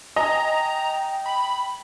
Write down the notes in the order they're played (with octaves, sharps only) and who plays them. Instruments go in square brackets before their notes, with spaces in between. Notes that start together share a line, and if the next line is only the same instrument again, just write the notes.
[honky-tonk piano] D#5 G#5 [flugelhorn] G5 [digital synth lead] A#5
[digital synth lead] B5